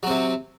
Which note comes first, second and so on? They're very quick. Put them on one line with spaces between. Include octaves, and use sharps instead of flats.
F#3 C4 C3